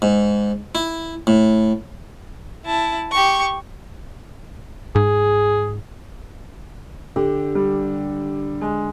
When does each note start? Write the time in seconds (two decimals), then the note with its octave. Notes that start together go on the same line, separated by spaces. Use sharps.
0.02 G#2
0.75 E4
1.27 A2
2.66 E4 A5
3.12 G4 C#6
4.95 G#2 G#4
7.16 D3 G4
7.55 G3
8.61 G#3